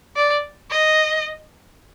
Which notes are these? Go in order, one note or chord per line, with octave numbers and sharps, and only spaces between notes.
D5
D#5